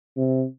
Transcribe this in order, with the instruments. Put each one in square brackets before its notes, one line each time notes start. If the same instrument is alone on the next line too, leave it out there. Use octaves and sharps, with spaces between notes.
[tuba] C3